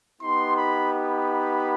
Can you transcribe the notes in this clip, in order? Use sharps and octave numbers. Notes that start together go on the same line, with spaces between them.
B3 D#4 G4 C6
B5
B5